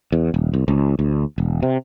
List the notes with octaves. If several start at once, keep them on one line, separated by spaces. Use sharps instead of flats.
E2
D#1
C2
C#2
D2
E1
C3